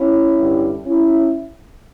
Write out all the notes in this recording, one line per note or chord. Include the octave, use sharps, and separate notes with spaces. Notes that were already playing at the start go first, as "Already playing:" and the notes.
Already playing: C#4 E4
G2 D3 G3
C#4 E4